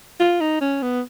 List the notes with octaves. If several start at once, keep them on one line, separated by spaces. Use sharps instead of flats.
F4
D#4
C#4
B3